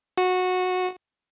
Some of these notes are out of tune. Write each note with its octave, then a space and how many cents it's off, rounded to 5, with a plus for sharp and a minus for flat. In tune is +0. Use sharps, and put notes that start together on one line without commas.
F#4 -15